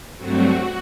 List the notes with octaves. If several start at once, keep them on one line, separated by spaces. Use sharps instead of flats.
G2 F#3 A3 C4 F#4